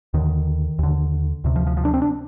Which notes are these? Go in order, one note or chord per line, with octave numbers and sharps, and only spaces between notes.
D#2 D3 D#3
D#2 D3
D2 C3
F3
F3
F3
D4
C4
D4